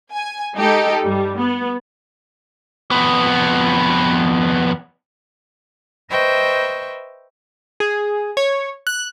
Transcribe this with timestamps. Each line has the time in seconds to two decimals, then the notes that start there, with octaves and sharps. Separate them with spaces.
0.13 G#5
0.55 G#3 D#4 G4 A4
1.04 G2 G3
1.38 B3
2.91 F2 B3
6.10 B4 C5 D#5 E5 G5 C#6
7.80 G#4
8.37 C#5
8.87 F#6